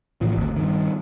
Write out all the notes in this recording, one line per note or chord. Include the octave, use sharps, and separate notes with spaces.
A2 E3 F3
G#1 D2
G2 D#3